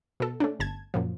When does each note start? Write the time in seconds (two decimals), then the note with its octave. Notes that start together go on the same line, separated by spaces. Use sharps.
0.20 B2 A4
0.40 A3 C#4 D4
0.60 G1 A5 G#6
0.94 F#2 A#2 F3